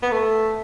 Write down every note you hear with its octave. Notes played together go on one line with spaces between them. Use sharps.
B3
A3